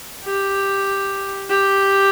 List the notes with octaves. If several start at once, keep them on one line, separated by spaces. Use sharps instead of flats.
G4
G4